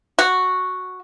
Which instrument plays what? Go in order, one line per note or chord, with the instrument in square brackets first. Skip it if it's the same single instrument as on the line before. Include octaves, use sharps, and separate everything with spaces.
[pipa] F#4